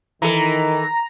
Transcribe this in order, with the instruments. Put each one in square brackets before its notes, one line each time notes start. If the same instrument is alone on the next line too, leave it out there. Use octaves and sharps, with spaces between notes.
[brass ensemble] D#3 [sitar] E3 A4 [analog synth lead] A#5